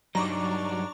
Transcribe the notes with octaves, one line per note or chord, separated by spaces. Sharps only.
G2 F#3 G3 D4 D#4 A#5 C#6 D6